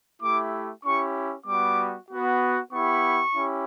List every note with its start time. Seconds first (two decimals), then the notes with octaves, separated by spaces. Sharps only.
0.21 A3 E4 G4 D6
0.84 C#4 E4 G4 C#6
1.46 G3 B3 F#4 D6
2.10 B3 F#4
2.72 B3 E4 G4 C#6
3.35 C#4 E4 G4